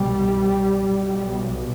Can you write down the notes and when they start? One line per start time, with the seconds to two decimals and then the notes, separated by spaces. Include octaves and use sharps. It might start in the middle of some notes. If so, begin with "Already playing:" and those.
Already playing: C2 B2 G3
0.82 B1 B2